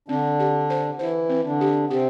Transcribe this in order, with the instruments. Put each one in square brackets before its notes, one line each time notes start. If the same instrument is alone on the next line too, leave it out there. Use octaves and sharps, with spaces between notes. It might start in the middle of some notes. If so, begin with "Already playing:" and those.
[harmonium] D3 D4 [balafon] C4
[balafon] G4
C5
[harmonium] E3 E4 [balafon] C5
[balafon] C4
[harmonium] D3 D4
[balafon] G4
[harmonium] C3 C4 [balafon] G4